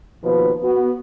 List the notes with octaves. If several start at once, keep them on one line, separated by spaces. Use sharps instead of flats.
D#2 B2 F3 B4
B3 F#4